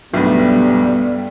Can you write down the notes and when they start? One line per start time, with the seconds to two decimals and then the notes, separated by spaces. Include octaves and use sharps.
0.14 B1 G2 G3 A3 B3 B4